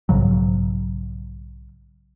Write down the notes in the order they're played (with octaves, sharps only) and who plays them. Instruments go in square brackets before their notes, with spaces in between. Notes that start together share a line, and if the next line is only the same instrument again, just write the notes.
[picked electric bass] B1 G#2 C#3 F#3